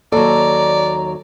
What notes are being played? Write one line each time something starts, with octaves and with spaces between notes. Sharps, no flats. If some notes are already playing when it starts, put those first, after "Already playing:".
D#2 F#3 A4 D5 A#5